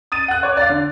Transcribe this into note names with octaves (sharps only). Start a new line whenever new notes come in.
D#6 A6 D#7
F#5 F#6
C#5 D6
D5 F5
D3